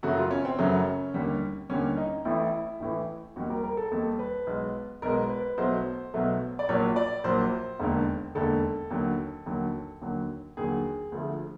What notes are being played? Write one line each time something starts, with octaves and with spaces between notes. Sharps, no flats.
F#2 C#3 F#3 A3 F#4
F4
C#4
C4
F#2 C#3 F#3 A3 C#4
D#2 D3 G3
D#2 D3 G3 C#4
D#4
A1 A2 E3 E4
A1 A2 E3
D#2 D#3 G3 F#4
A#4
A#4
A4
D#2 D#3 G3 A4
B4
B1 B2 G#3
B1 B2 G#3 A#4
B4
B1 B2 F#3 A3 C5
B1 B2 F#3 A3
D5
A#1 A#2 F#3 C#5
D5
A#1 A#2 F#3 C5
E1 D#2 D3
E1 D#2 D3 A4
D#2 D3 F#3
D#2 D3 F#3
D#2 D3 F#3
D#2 D3 F#3 G#4
D2 D3 F3 A3